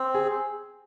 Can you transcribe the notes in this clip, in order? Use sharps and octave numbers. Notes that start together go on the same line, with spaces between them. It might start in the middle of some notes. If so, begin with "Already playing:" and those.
Already playing: C4
G#4